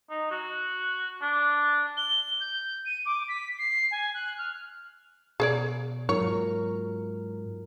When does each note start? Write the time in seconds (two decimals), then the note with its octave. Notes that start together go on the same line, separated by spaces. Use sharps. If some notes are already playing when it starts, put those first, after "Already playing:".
0.10 D#4
0.31 F#4
1.22 D4
1.97 G7
2.40 G6
2.86 D#7
3.06 D6
3.29 B6
3.58 C7
3.91 G#5
4.14 F#6
4.38 F6
5.40 B2 G#4 C#5 D5
6.09 G#2 F#3 F4 A#4 C#5